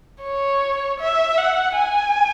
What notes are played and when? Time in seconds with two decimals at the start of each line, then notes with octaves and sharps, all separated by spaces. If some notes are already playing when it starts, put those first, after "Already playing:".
0.23 C#5
1.00 E5
1.38 F#5
1.76 G#5